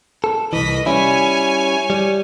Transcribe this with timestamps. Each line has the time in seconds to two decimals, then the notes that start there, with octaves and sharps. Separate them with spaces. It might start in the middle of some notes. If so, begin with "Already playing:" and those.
0.24 A4
0.53 C2 E3 D#5 B6
0.86 G3 C#4 E4 C#5 G#5
1.90 G3